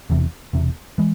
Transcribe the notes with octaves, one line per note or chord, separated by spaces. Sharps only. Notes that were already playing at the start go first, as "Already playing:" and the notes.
E1 E2 C3
E1 E2 C3
E3 G#3